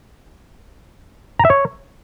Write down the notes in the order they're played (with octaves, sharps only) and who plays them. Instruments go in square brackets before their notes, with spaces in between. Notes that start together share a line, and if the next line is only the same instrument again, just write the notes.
[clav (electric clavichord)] A#5
E5
C#5